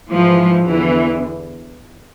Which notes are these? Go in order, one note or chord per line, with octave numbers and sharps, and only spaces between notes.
G#2 E3 F3
E2 D3 E3